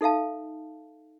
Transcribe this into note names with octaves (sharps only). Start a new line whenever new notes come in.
D#4 A4 E5 F5 A5